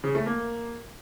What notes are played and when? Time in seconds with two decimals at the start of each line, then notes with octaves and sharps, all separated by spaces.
0.04 C#3
0.15 A3
0.26 A#3